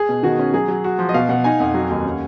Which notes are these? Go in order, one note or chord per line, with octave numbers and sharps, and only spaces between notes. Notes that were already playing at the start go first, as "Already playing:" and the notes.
Already playing: G#4
B2
D#3 F#4
C#4
F#3 G#4
F#3
F#4
F3
D#5
B2 F5
B2 F#5
D#4 G#5
F2 F#5
F#3
D#2
C#4